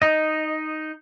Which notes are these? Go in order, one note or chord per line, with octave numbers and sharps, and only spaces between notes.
D#4 D#5